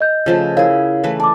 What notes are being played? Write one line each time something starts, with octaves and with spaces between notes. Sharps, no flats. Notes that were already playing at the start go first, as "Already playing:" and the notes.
D#5 G6
C#3 F3 A3
E4 G#4 A#4 C#5 F5
E3 A3 B4
D5 A5 D6